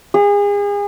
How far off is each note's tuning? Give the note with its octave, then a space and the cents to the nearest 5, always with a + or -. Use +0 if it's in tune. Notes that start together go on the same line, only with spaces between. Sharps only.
G#4 -35